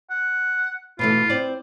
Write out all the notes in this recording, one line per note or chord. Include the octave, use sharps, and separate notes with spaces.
F#5
B2 E3 A3 F4
C4 D5